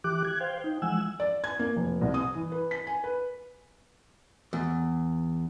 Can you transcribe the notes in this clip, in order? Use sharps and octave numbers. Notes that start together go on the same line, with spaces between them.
E3 G4 D6 F#6
F#6 G#6
C5 F5 G5
D#4 G5
E3 F3 G#3 F#5 G#5 E6
D5
G#6
A#3
F1
C2
D#6
E3
B4
B6
G#5
B4
E2